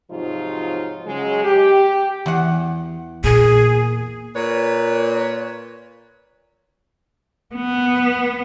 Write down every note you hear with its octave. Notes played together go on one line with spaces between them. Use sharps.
G#2 C3 F3 F#3 D#4 F4
C#3 F#3 G#3
G4
E2 F#5
A#2 G#4
A#2 B4 C#5
B3